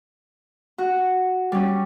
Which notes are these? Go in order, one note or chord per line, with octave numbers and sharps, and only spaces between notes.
F#4
G3 C#4